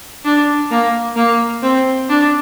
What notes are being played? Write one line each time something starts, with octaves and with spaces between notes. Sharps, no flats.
D4
A#3
A#3
C4
D4